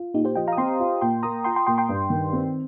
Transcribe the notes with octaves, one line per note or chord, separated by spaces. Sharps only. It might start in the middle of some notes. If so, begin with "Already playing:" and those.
Already playing: F4
A#2 D#4 G4
G4 C5
F3 D#5 G5
F5 A#5
D#6
C4 G5 C6
F4
A#2 G5 C6
A#3 A#5 D#6
F4 G5 C6
G5 C6
A#2 G5 C6
G5 C6
G2
D#3
C4